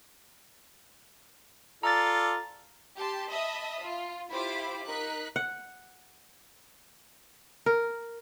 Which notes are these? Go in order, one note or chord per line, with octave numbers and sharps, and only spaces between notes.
F4 A4 D5 A#5 A6
G4 A5 C6
D#5 E5 A5 B5 D#6
F4
E4 F4 G4 C5 B5 D6
D#4 A#4 F#6 B6
F#5
A#4